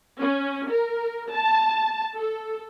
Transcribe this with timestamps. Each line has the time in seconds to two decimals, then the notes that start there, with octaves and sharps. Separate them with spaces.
0.21 C#4
0.69 A#4
1.32 A5
2.17 A4